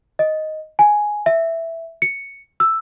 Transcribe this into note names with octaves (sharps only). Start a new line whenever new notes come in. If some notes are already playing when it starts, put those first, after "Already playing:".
D#5
G#5
E5
C#7
E6